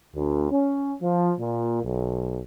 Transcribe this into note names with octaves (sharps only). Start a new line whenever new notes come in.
D2
C#4
F3
A#2
B1